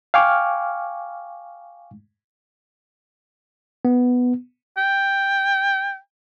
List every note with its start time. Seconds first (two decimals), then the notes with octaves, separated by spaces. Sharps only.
0.14 F5 G5 G#5 C#6 D6 F6
3.85 B3
4.77 G5